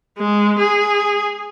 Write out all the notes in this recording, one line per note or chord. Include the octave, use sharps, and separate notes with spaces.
G#3
G#4